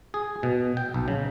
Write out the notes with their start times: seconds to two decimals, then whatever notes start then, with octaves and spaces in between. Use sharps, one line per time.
0.14 G#4
0.43 B2
0.77 G5
0.94 B1
1.08 C#3